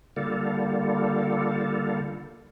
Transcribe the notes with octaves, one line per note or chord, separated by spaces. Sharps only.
D3 G3 A#3 F4 A4